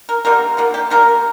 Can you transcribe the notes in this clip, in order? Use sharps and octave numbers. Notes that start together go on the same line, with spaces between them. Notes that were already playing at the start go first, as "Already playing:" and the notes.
A#4
D3 G3 A#3 A#4
D3 F3 A#3
G4
D3 G3 A#3 A#4